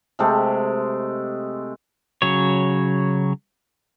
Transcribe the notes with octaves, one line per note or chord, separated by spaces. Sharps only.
C3 G#3 A3 G4
C#3 F#3 C#5